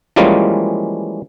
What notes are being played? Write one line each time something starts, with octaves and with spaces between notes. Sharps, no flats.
E3 F3 G3 G#3 A#3 C#4